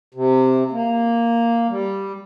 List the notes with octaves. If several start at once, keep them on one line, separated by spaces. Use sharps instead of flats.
C3
A#3
G3